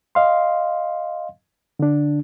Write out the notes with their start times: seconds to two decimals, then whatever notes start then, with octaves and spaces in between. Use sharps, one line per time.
0.15 D#5 F5 C6
1.79 D3 D4